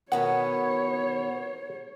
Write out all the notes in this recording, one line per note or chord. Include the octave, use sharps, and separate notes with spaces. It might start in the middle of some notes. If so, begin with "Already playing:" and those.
B2 D#3 B3 C#5 F#5